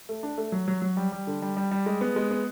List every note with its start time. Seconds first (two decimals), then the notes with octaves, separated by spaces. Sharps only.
0.09 A3
0.23 D4
0.38 A3
0.52 F#3
0.68 F#3
0.82 F#3
0.97 G3
1.12 G3
1.27 D3
1.42 G3
1.57 G3
1.71 G3
1.86 G#3
2.01 B3
2.16 G#3
2.31 B3